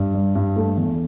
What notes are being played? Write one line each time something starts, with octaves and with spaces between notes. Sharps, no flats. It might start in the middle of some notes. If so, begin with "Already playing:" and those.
Already playing: G2
G3
G2
A3
E2